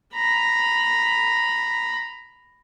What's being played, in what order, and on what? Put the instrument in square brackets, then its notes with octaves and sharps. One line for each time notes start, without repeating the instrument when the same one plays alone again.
[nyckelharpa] A#5 B5